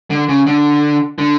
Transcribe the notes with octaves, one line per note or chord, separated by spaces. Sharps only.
D3
C#3
D3
D3